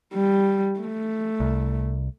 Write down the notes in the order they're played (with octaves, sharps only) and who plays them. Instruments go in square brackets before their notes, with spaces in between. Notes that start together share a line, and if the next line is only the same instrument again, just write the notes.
[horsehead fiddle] G3
A3
[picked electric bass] C2